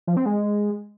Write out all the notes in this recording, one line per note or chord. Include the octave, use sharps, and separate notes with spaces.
F3
C4
G#3